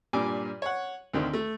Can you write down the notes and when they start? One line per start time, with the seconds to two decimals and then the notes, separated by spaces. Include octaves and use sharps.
0.13 G2 A#2 G3 G#5 D6
0.62 C#5 F#5
1.14 D2 D#3 C4
1.33 A3